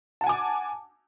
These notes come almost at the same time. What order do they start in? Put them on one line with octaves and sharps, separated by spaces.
A5 F#5 G#5 D6